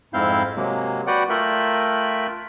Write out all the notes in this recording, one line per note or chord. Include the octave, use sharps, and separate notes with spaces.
F2 G#2 C4 E4 F5 G6
C3 F#3 G#3 A#3
F#4 B4 D5 F#5 G5
A3 F4 A#4 E5 G5 F#6